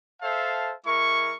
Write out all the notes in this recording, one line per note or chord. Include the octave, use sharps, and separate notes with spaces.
A4 C5 E5 F5 A5
G#3 E4 A#4 C#6